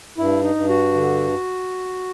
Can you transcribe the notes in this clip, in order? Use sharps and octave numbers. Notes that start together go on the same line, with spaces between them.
G2 E4
D#4
G2
F#4
D3